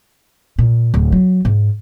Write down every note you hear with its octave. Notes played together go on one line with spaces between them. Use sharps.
A#2
D1
F#3
G#2